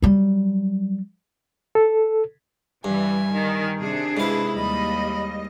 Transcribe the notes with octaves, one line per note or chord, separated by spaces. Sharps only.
F#3 G3
A4
G2 E3 G3 G#5
D#3
C3 D4 G#4
G#2 E4 B4 F5
D#2 G3 D#5 B5